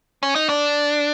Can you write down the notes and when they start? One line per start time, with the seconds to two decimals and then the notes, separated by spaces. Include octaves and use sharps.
0.23 C#4
0.35 D#4
0.49 D4